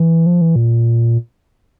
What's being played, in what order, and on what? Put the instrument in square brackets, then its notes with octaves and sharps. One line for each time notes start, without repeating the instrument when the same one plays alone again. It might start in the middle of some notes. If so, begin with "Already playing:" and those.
Already playing: [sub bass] E3
F3
E3
A#2